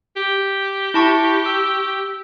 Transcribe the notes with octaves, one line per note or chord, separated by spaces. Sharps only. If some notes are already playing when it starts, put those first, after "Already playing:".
G4
E4 A5 C#6
E6